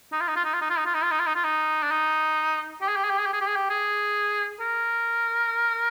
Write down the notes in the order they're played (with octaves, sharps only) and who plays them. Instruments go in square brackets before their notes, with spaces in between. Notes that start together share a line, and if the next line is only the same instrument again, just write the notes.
[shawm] D#4
F4
D#4
F4
D#4
F4
D#4
F4
D#4
F4
D#4
F4
D#4
F4
D#4
F4
D#4
D4
D#4
G4
G#4
G4
G#4
G4
G#4
G4
G#4
G4
G#4
G4
G#4
A#4